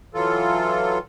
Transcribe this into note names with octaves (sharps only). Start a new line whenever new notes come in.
E3 F#3 F4 A4